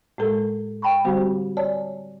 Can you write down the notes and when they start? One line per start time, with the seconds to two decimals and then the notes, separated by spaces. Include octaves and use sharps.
0.18 A2 G#3 A4 A#4
0.82 G5 A5 B5 C#6
1.05 D3 G3 C4 F#4 G4 C5
1.57 C#5 D5 G#5 A5